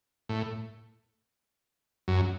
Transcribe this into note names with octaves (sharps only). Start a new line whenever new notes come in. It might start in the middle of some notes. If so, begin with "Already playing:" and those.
A2
F#2